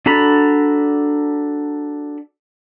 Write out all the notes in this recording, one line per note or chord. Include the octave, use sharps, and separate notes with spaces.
D4 F#4 A4 A#5 B5